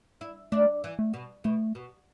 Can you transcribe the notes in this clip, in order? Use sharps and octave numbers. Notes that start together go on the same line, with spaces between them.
E4
A3 D4
E3
A3
B2
B2 A3
B2